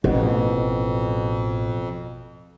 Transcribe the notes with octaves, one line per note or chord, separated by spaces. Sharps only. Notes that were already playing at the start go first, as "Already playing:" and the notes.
A1 F2 B2